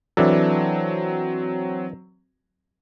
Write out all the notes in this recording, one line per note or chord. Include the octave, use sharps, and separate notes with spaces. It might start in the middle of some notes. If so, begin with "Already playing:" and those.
E3 F#3 C4 D4 A4